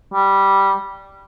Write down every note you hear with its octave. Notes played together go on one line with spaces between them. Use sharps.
G3